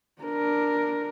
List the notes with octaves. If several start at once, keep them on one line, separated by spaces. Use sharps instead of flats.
D4 A#4